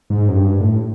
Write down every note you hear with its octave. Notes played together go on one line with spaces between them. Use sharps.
G#2
F#2
G2
A2